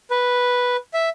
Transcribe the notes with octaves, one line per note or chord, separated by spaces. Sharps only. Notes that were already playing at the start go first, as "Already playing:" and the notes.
B4
E5